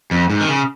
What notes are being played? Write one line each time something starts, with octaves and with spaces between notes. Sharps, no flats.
F2
G#2
D#3
C#3